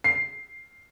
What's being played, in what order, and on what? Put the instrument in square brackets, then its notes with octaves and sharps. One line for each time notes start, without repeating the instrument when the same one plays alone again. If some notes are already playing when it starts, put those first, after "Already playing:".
[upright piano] C7